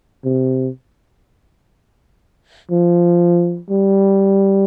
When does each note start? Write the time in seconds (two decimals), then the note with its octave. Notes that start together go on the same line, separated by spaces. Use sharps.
0.24 C3
2.71 F3
3.70 G3